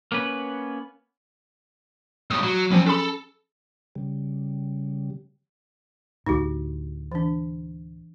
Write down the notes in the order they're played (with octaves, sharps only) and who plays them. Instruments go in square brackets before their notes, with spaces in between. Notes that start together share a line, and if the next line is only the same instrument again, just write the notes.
[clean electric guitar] A#3 B3 C#4 B4
[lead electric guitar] A2 G3 [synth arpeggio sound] D#6
[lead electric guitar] F#3
[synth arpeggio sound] F3 F#3 [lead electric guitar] C#4 G5
[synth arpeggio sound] C#4 G#4 B5 [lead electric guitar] A4
[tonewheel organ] C#3 G3
[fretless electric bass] D2 A2 [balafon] D#4 F#4 G4
[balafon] E3 D4